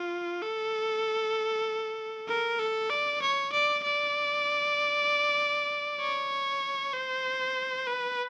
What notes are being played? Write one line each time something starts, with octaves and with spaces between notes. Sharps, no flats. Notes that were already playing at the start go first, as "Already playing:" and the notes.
Already playing: F4
A4
A#4
A4
D5
C#5
D5
D5
C#5
C5
B4